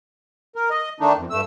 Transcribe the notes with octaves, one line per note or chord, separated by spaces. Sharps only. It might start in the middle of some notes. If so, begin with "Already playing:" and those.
A#4
D#5
D#3 A3 D4 D#4
F2
G2 A3 E6